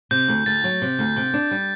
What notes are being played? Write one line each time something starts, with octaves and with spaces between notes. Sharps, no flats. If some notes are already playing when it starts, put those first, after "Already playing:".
C3 G6
D2
D2 A6
F#3
C3
D2
C3
D4
G3